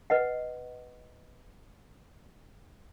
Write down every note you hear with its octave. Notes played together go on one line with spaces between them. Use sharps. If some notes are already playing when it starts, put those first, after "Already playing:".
B4 D#5 F#5